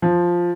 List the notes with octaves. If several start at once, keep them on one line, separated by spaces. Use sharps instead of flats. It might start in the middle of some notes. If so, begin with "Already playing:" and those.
F3